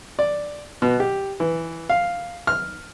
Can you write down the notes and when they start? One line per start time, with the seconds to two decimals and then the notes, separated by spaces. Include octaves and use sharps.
0.19 D5
0.82 B2
1.00 G4
1.40 E3
1.89 F5
2.47 F6